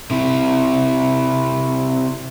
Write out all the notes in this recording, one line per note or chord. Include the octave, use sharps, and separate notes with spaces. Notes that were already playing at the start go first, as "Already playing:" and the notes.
C3 E4